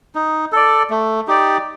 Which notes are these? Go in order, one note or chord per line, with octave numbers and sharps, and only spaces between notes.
D#4
A4 D5
A3
D#4 G4 D5